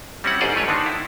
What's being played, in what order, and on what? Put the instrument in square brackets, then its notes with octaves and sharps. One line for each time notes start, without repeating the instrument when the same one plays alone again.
[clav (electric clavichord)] G3 C4 C#4 E4 F#5
G1 G#2 G#4 C5 D5 F#5
A3 B4 C#5
D3 D#3 D4 D#4
E4